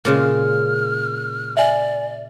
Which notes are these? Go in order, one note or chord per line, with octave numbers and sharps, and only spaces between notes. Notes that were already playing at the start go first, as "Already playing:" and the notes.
A#2 C#3 G#3 F6
D5 E5 G#5